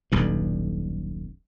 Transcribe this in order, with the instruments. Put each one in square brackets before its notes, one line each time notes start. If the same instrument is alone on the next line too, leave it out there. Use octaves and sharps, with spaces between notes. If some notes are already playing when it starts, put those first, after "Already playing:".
[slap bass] D#1 B1 G2